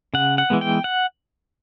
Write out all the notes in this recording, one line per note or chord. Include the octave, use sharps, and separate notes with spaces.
C#3 F#5
F#5
E3 G#3 B3
G5
F#5